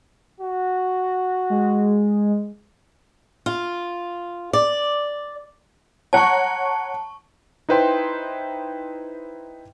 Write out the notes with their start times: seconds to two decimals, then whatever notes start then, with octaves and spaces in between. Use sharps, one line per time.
0.40 F#4
1.50 G#3
3.46 F4
4.53 D5
6.13 C#5 F#5 A5 A#5 C#6
7.69 D#4 E4 B4 C5 G5 C6